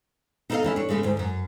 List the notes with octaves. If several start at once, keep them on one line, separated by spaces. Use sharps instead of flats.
D#4 E4 A4 A#4 D#5 F5
D#2 E3 C#4 E5
D4 C#5
C#3 E3 G#3 A3 C#4
D2 G#2
F#2